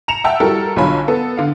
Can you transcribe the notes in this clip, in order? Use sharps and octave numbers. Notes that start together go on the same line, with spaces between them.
A#5 C#7 E7 F7
E5 F#5 G5 A5 E6
G3 E4 F#4 A4 A#4
B1 D3 F4 C#5 G#5 B5
B3 A4
D3 F5